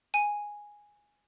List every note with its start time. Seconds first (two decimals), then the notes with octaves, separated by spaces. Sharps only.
0.14 G#5